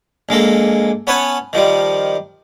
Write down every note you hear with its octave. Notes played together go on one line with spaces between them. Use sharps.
A#1 G#3 A#3 A4
B3 C#4 B4 C#5 A5
D#3 F3 G3